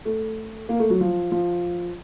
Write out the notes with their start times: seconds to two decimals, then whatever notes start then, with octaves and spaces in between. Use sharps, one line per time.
0.05 A3
0.69 A#3
0.80 A3
0.90 F#3
1.01 F3
1.32 F3